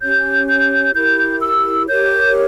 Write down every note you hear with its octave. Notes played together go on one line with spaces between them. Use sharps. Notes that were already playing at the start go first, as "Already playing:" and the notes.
C#4 G4 C#5 G6
G6
E4 G4 A#4 G6
E6
G4 A#4 C#5 G6